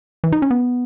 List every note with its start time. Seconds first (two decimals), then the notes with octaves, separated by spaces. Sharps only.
0.24 E3
0.32 D#4
0.42 C#4
0.51 B3